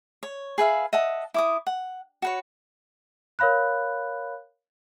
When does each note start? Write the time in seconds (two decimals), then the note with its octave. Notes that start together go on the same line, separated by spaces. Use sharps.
0.23 C#5
0.58 G#4 B4 E5 F5
0.93 D#5 E5 F#5 A5
1.34 E4 D6 D#6
1.67 F#5
2.22 F#4 B4 C#5
3.39 A#4 C#5 F5 B5 F#6